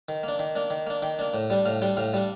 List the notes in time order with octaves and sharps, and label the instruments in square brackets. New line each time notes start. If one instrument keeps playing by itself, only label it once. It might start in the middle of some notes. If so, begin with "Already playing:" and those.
[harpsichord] D#3
A#3 D4
D#3
A#3 D4
D#3
A#3 D4
D#3 G5
A#3 D4
A2
G3 D4
A2 F5
G3 D4 G5
A2 F5
G3 D4